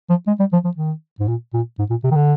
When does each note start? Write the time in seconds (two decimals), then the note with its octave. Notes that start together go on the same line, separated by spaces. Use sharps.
0.10 F3
0.27 G#3
0.40 G3
0.53 F3
0.65 F3
0.77 D#3
1.20 G#2
1.28 A#2
1.54 A#2
1.79 G#2
1.90 A#2
2.04 C3
2.11 D#3
2.16 D3